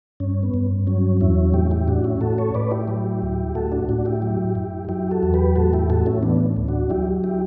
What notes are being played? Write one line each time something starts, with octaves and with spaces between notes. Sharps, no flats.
G2 C#4
B3
G2
F#3 C#4
E2 C#4 E4
A2 E4 G4
E4 G4
A2 D4 F#4
C#4 E4
A2 F#4 A4
A4 C#5
A2 B4 D5
E4 G4
F#3
D2
A2 F#4 A4
D4 F#4
A2 D4 F#4
E4 G4
F#3
F#2
F#3 E4 G4
F#4 A4
E2
G4 B4
A2 F#4 A4
E4 G4
A2 F#4 A4
C#4 E4
E3 B3 D4
D2
D4 F#4
F#3 E4 G4
E4 G4